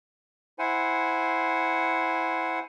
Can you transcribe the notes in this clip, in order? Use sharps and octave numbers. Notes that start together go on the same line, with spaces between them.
E4 C5 F#5 G#5